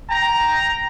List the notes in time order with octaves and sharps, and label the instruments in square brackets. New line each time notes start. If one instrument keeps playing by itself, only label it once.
[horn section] G5 A#5